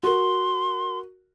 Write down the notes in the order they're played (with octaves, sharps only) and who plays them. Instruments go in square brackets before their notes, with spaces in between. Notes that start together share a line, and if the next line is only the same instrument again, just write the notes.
[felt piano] F#4 A#4 [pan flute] C6